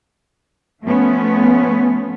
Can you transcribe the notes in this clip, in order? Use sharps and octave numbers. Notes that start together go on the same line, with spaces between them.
F3 A3 B3 C#4